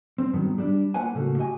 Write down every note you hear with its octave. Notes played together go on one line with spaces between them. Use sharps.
C4
G2 D#3 F#3 B3
G3 D4
A#3 F4 B4 C#5 F#5 G#5
A2 C#3 A3 A#3 C#4 F#4
F#4 G4 D#5 G5 G#5